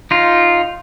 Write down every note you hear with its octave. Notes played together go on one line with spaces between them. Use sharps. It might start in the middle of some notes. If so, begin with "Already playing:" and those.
D#4 F4